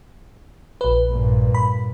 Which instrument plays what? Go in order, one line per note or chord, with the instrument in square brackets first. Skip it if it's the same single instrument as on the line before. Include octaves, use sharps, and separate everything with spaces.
[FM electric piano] A#1 B4
[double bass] G2 A#2
[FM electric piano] B5